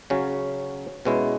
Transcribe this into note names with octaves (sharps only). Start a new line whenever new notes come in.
C#3 F#3 C#4
B2 G#3 C#4 E4